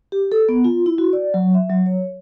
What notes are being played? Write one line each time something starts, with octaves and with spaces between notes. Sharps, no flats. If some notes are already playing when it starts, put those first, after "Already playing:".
G4
A4
B3
F4
E4
F#4
D5
F#3
E5
F#3
C#5